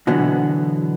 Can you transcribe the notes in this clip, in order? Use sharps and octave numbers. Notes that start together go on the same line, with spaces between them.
B2 D3 E3 F#3 B3